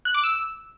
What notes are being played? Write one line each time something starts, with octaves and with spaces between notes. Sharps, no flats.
F#6
D6
E6